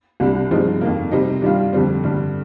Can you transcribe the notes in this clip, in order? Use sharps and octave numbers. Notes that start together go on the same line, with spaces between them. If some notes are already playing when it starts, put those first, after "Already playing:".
C2 C3 G3 D4
G2 F3 G#3 C4 D#4
F2 D#3 A#3
C3 G3 C4 D#4
G2 D#3 G3 D4 F4
F2 D3 G3 C4
G2 D3 G3